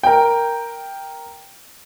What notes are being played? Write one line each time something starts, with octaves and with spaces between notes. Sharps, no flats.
A#4 G5